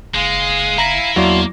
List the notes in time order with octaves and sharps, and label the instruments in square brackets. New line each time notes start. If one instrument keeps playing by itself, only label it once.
[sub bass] F#1 [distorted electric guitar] G#3 [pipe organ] F5 G#5
[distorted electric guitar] E5 B5 [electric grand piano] A#5 A#6
[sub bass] E2 [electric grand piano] F#3 E4 D5 [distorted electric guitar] A#3 [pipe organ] F5 A5 C6